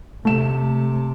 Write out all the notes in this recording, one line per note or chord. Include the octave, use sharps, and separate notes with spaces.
C3 A3 E7